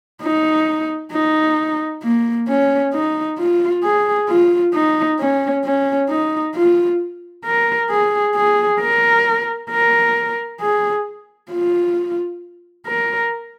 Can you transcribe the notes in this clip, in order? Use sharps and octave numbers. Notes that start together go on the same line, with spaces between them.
D#4
D#4
A#3
C#4
D#4
F4
G#4
F4
D#4
C#4
C#4
D#4
F4
A#4
G#4
G#4
A#4
A#4
G#4
F4
A#4